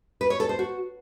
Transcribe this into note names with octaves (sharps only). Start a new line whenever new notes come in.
B4
C#5
A4
C5
F#4